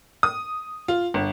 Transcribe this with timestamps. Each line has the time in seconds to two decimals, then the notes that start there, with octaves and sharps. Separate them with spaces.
0.23 D#6
0.88 F4
1.14 G1